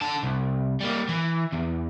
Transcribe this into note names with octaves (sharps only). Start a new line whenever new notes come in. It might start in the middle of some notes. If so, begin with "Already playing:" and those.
D3 A5
C2
G3 A#3
E3
E2